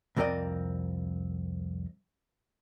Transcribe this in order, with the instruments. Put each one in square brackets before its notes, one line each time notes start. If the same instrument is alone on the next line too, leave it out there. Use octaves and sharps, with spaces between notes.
[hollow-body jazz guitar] C2 F2 C4 A#4 D5 D#5